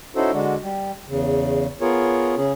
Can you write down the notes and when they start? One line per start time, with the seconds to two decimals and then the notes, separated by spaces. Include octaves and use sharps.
0.16 C#4 D#4 E4 F#4 A4 C5
0.33 D3 G#3 D4 F#4
0.62 G3
1.08 E2 C#3
1.81 B3 F4 G#4 A#4 C#5
2.37 C#3 C#4 G#4